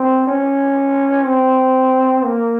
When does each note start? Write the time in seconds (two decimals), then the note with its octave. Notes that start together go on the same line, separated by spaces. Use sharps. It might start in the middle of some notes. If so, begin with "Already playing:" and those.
Already playing: C4
0.28 C#4
1.27 C4
2.24 A#3